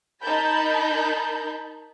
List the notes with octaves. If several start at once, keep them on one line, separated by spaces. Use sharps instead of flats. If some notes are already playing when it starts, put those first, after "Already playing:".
D#4 A#4 A5 B5 G6